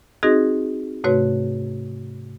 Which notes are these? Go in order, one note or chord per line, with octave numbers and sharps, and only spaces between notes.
C4 D#4 F#4 G#4 D#5 A#6
G#2 C3 A3 F#4 B4 C#5